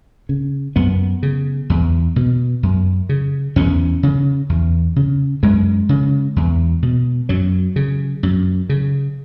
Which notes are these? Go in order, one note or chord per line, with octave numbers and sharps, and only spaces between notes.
C#3
F#2 B3
C#3
E2
B2
F#2
C#3
E2 C#4
C#3
E2
C#3
F#2 G#3
C#3
E2
B2
F#2 F#3
C#3
F#2
C#3